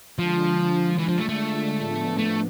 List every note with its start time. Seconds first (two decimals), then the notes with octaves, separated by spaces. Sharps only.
0.18 D3 F3 G#3 D4 F4
0.98 E3
1.09 F3
1.18 A3
1.29 A3
1.79 A2 F3 B3 D4
2.18 A3